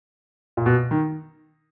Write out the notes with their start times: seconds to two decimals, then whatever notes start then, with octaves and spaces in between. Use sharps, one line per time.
0.57 A#2
0.66 B2
0.91 D#3